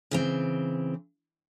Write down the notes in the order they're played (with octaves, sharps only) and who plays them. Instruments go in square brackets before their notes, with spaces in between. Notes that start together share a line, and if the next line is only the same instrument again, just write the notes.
[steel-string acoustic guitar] C#3 E3 C4